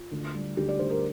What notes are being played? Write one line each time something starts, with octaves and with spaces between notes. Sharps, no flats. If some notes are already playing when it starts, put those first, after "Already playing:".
Already playing: F4
D2
G3
D2 G4
D5
D2 C5
A#4